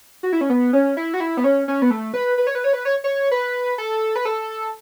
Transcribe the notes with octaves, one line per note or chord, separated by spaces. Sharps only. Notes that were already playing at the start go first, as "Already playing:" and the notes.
F#4
E4
C#4
B3
C#4
E4
F#4
E4
B3
C#4
C#4
B3
A3
B4
B4
C#5
B4
C#5
B4
C#5
C#5
B4
A4
B4
A4